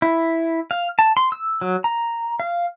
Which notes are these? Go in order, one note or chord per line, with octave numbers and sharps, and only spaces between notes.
E4
F5
A5
C6
E6
F#3
A#5
F5